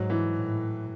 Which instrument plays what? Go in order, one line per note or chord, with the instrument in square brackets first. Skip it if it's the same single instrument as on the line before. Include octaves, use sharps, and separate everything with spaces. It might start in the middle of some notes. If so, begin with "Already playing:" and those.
Already playing: [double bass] G#2 [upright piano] F#3
[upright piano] E3
[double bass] A2